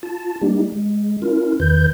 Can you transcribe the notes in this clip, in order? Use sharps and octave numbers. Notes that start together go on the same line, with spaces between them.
F4 A5
G3 A#3 D4 D#4 G4
G#3
C#4 E4 F4 A#4
E2 D#3 B4 G6